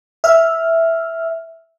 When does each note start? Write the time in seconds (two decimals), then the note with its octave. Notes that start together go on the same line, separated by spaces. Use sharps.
0.24 E5 F6